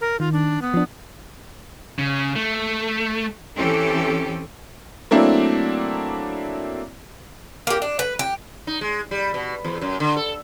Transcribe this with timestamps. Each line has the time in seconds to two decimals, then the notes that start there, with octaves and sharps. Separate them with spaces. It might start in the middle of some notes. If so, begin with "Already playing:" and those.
0.01 A#4
0.20 D#3 F4
0.33 D4
0.62 B3
0.74 F3 D4
1.99 C#3
2.36 A3
3.57 E3 C4 C#4 G4 A4
5.11 F#3 A3 A#3 C4 D4 E4
7.67 A#3 G4
7.82 D4
7.99 B4
8.19 G4
8.67 D#4
8.81 G#3
9.11 G3
9.34 B2
9.65 E2
9.81 F#2
10.00 D3
10.17 A4